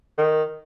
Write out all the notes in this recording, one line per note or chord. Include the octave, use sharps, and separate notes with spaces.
D#3